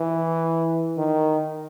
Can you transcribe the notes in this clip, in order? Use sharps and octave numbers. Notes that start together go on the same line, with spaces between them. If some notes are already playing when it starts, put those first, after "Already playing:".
Already playing: E3
D#3